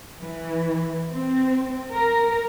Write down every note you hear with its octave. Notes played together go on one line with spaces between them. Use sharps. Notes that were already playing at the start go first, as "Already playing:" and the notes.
E3
C4
A#4